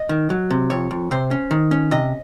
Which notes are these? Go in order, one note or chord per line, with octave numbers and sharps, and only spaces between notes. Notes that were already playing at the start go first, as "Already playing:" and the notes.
Already playing: D#5
D#3
F#3
C3
F2 C#5
F2
C3 C5
C#4
D#3
C#4
C3 D#5